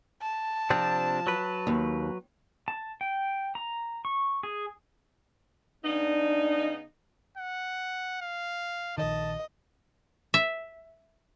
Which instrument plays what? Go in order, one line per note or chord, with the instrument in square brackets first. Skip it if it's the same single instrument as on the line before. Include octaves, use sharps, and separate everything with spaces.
[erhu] A5
[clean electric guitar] C3 C4 D4 [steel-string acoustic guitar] F3
[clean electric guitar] F#3 B4
[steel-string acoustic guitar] D#2
[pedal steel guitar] A5
G5
A#5
C#6
G#4
[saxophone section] C#3 B3 D#4 [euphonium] D4
[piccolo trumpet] F#5
F5
[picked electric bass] A#1 D#3 [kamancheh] D#5 [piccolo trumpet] A5
[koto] E5